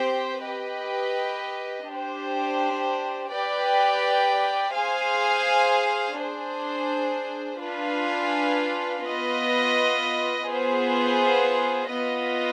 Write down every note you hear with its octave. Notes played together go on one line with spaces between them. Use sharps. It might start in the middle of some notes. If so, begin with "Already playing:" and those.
Already playing: C4 G4 C5 G5
G4 B4 D#5
D4 G4 C5
G4 B4 D5 G5
G#4 C5 F5 G#5
D4 G#4 C5
D4 F4 B4 F5 G#5
B3 F4 B4 D#5
B3 F4 G#4 C5
B3 F4 B4 D#5